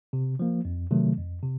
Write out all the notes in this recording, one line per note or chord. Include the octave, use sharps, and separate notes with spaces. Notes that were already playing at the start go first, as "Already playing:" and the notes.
C3
F3 A#3
F2
C3 D#3 F#3 A3
F2
C3